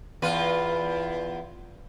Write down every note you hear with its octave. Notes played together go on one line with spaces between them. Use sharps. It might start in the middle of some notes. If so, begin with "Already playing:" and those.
E2 F4 B4